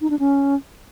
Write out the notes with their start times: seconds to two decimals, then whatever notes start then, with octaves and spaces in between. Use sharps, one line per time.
0.01 D#4
0.10 D4
0.19 C#4